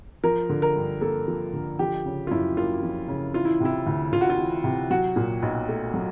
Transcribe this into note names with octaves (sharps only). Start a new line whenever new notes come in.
F3 A#4
D3
A#4
G2
A#3 A4
F3
D3
F3 G4
C#3
F4
F#2 E4
A#3 F4
F3
C#3
E3 F4
E4
C3 E4
D2
D2 F4
F#4
F4
E3
C3
F#3 F#4
A#2
B1
A3
F#3